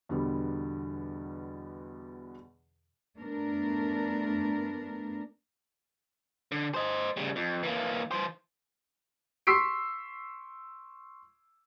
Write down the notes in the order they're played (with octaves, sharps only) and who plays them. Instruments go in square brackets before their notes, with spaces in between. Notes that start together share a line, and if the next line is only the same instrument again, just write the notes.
[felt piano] E2 B2 D3 G3 B3
[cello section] A3 B3 D4 A#4
[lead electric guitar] D3
C5 D#5
C#3 G3
F2
E3 A#3
E3 C5
[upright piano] C6 C#6 E6 B6 C7 D7